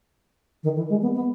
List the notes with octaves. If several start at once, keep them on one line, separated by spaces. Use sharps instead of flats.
D#3
E3
G#3
B3
B3